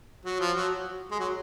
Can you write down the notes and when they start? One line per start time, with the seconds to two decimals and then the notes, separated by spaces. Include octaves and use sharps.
0.25 F#3
0.40 F3
0.56 F#3
1.11 G#3
1.19 F#3